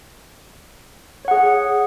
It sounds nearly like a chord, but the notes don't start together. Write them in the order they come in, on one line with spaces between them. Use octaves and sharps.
C#5 F#5 G#4